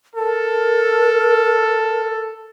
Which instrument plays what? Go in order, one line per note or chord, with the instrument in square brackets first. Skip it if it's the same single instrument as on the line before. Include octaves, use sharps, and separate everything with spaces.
[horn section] A4 [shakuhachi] A#4